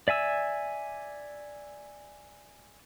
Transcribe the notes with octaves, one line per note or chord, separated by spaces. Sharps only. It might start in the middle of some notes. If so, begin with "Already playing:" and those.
D5 E5 G#5 E6